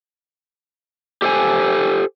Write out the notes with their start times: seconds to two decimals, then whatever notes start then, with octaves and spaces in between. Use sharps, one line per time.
1.22 G4 A4 C5 G#5